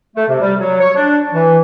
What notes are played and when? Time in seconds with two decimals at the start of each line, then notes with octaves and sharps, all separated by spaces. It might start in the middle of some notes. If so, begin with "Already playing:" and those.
0.15 A3
0.28 C3
0.41 G3
0.59 F#3
0.80 C#5
0.95 D4
1.33 E3